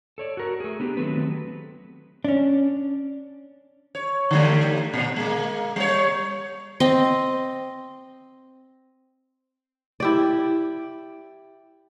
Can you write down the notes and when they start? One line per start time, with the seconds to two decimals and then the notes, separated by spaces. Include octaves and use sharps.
0.18 A4 C#5 D5
0.37 F#4 A#4
0.60 A3 G#4
0.80 B3 D4 G4
0.97 D#3 F#3 A3 B3 C4 B4
2.25 C#4 D4
3.95 C#5
4.31 D3 G3 A3
4.94 A#2
5.16 G#3 A#3
5.76 G3 C#5
6.80 C4 D#5
10.00 E4 G4 D5